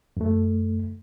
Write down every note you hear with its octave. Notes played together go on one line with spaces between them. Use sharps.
F#2 A3